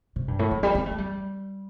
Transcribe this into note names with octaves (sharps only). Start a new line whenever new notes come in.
C3
G2
A2
D3
G3
C4
A3
G3